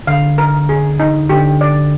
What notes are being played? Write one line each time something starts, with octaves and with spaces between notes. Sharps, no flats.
D3 F5
A#4
G#4
D#4
D3 G4
D5